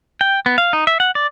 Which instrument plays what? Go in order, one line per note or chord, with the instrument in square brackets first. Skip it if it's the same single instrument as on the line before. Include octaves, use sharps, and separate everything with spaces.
[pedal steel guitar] G5
B3
F5
D#4
E5
F#5
D5